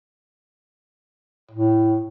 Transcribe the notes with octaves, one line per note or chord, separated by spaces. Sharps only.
A2